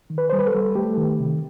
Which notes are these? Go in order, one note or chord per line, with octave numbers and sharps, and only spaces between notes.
D#3
B4
G3 C5
B4
A4
G3
A3 G4
D#3
C3